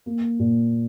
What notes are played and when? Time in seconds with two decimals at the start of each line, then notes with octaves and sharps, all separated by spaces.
0.06 A#3
0.39 A#2